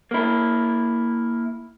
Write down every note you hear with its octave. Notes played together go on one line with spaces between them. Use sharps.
A#3 E4